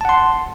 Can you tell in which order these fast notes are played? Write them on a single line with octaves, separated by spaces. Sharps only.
A5 F#5 C6